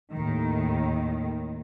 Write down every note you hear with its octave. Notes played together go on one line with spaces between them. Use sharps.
D#2 A2 D#3